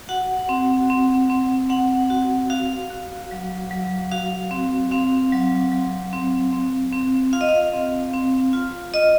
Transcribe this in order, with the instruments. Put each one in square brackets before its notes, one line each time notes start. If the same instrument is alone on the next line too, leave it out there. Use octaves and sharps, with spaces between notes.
[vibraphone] F#4 F#5
C4
C4
C4
C4 F#5
F#4
F#4 F5
F#4
F#3
F#3
F#4 F5
C4
C4 F5
F#3
F#3
C4
C4
C4
F4 F5
D#5
F5
C4
C4
F4
F4 D#5